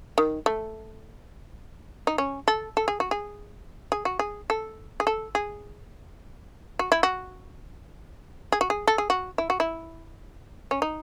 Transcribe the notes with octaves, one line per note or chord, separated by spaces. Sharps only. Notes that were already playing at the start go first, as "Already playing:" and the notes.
D#3
A3
D#4
C#4
A4
A4
G#4
F#4
G#4
G#4
F#4
G#4
A4
G#4
A4
G#4
F#4
E4
F#4
G#4
F#4
G#4
A4
G#4
F#4
E4
F#4
E4
C#4
D#4